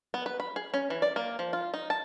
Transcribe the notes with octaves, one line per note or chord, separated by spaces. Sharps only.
B3
B4
B5
G#4
C#4
E3
D5
A#3
F3
F4
D#4
A5